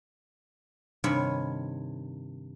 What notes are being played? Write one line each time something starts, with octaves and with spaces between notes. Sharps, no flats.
G2 C3 D#3 C#5 G#5 B5